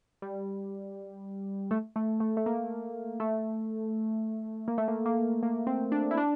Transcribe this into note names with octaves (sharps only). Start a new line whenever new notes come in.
G3
A3
A3
A3
A3
A#3
A3
A#3
A3
A#3
A#3
A#3
C4
D4
E4
D4